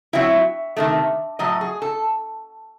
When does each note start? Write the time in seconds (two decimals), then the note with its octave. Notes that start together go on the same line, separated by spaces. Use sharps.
0.13 F#3 C4 E4 E5
0.77 C3 D#3 A3
1.39 A2 F#3 D#5
1.61 G#4
1.82 A4